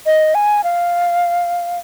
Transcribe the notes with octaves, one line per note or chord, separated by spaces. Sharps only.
D#5
G#5
F5